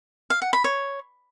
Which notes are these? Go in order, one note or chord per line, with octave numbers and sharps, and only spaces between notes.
F5
F#5
B5
C#5